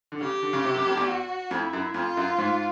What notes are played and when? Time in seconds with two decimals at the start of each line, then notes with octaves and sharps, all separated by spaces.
0.12 D3
0.21 C#3 G4
0.42 D3
0.53 C#3
0.64 C3
0.75 F#2
0.87 F2
0.97 E2
1.08 F#4
1.51 F2 E4
1.73 F#2
1.94 F2 F4
2.17 F#2
2.38 G#2